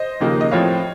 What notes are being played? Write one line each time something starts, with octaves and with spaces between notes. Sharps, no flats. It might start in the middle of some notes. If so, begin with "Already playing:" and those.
Already playing: C5 D#5
D#2 C#3 F3 A#3 D#4
D#5
A2 F3 C4 C#5 F5